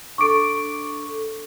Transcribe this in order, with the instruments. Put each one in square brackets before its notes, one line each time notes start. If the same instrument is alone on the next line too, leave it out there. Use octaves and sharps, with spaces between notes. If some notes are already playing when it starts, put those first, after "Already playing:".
[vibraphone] D4 A4 [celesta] C#6 D6 D7